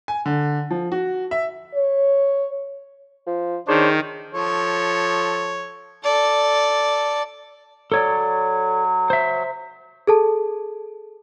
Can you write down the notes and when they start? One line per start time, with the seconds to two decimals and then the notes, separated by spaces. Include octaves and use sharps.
0.08 G#5
0.26 D3
0.70 F3
0.92 F#4
1.31 E5
1.75 C#5
3.27 F3
3.68 D#3 D4 G#4 C5 C#5
4.34 F3 A4 C#5
6.04 A4 D5
7.92 F#3 A4 C#5 D5
9.10 C5 E5
10.07 G#4 A4 A5